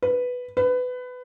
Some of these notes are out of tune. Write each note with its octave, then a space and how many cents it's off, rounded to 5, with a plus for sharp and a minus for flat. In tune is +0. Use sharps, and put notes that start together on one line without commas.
B4 +0
B4 +20